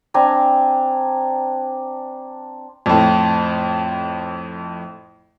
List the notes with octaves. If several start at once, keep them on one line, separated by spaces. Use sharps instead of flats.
C4 D4 G#5 A#5
F2 A2